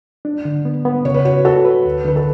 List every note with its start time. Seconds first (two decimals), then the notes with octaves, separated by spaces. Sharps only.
0.25 D4
0.45 D3
0.65 B3
0.85 B3
1.05 C#3 C#5
1.14 B4
1.25 F#4 C#5
1.45 F#4 A4
1.65 B4
1.85 D2
2.05 D3 B4
2.16 A4